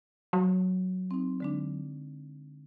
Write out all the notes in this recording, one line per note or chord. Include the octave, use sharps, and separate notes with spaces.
F#3
C4 D#4
D3 G#3 D4